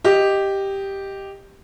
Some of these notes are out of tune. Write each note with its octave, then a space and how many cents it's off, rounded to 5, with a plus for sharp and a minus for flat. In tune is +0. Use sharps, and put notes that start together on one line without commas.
G4 +0 D#5 +0